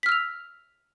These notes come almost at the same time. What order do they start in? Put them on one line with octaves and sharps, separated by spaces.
B6 F6 E6 F7